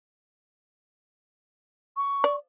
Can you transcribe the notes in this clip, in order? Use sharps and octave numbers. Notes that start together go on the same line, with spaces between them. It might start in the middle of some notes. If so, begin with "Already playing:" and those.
C#6
D5